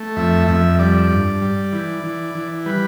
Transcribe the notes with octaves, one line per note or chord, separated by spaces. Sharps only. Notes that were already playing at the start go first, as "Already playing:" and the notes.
Already playing: A3
F2 E5
F2 E5
G3 D5
G2
G3
E3
E3
E3
G3 B4